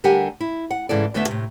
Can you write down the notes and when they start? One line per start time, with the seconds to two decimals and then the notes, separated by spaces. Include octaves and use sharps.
0.04 D3 G3 G4 A#4 F#5 G#5
0.40 E4
0.71 F#5
0.89 G#2 C#3 E3 E4 A4 D5
1.14 D2 D3 A3 B3 E4 E5
1.27 A2 C3